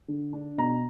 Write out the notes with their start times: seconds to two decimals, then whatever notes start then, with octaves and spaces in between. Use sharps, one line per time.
0.08 D3
0.33 D4
0.58 B2 A#5